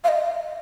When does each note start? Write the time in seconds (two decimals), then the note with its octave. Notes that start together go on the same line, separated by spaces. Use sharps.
0.04 F5
0.08 D#5